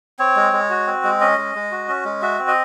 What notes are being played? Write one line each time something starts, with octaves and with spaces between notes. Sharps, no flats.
C4 C#5
G#3
G#3
F#4
C4
G#3
C#4 D#5
G#3
G#3
F#4
C#4
G#3
F#4 E5
C4
D#5